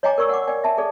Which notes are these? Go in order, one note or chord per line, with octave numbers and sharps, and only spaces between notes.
C#5 D#5 G5 G#5 A#5 D6
A#4 D5 C#6 E6
F#5 G5 D6
D5 G5 G#5
E5 A5
G#4 A4 D5